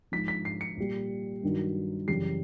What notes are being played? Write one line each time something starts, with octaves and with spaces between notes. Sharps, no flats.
G#2 F3 B6
B6
C7
C#7
A#2 G3
G2 D#3 F#3
F#2 C#3 E3 G3 C7